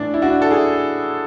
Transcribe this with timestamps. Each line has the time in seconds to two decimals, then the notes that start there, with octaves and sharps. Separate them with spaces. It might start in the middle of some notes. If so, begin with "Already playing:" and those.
Already playing: A2 E3 D4
0.14 E4
0.22 D4 F#4
0.42 A4
0.50 E4 G#4